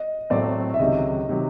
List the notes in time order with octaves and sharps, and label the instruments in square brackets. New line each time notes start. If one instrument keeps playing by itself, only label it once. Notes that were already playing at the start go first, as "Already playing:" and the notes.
Already playing: [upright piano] D#5
[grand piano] A2 F#3 A3 C4 [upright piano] D5
[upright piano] E5
[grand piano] C#2 C3 D#3 F#3 [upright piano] D#5
[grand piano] C3 D#3 F#3